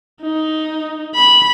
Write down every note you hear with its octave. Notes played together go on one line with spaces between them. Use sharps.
D#4
B5